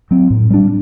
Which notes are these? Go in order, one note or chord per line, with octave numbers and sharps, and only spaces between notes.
F#3 C4
A2
G3 D4